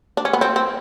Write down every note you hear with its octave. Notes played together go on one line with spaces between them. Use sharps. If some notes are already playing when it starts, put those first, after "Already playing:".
D4
C#4
B3
C4
C4